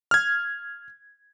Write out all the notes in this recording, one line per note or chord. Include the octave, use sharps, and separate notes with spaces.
F6 G#6